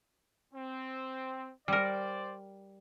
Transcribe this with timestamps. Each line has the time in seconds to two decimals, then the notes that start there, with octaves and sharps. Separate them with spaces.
0.54 C4
1.68 G3 A#4 C5 D5